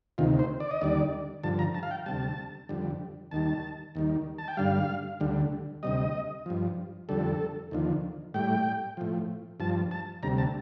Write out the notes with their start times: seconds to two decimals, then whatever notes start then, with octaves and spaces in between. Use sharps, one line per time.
0.18 D2 C3 D#3 F4
0.39 C5
0.60 D5
0.71 D#5
0.81 D#2 D3 G3 D5
1.43 G2 D3 F3 A5
1.59 A#5
1.74 A5
1.83 F5
1.91 G5
2.06 D2 C3 G3 A5
2.69 F2 D3 G3
3.31 D#2 D#3 G3 A5
3.95 D#2 D#3 G3
4.38 A5
4.48 G5
4.57 G2 D3 G3 F5
5.20 D2 D3 G3
5.83 D2 C3 G3 D#5
6.46 G2 F3
7.09 F2 D3 G3 A4
7.71 D#2 D3 F3
8.34 A2 G3 G5
8.97 A2 F3
9.60 G2 F3 A5
9.91 A5
10.23 D2 C3 G3 A#5
10.38 A5